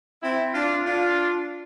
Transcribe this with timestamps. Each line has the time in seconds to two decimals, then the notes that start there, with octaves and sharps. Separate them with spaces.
0.22 C4 E4
0.54 D4 F4
0.86 D4 F4